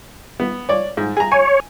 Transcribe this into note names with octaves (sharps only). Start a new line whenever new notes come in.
B3
C#5 D5
G#2
G#4 A#5
C#5 G#5